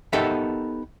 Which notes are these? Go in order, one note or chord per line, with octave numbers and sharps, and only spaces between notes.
B3 D#4 G4 A4 A#4 E5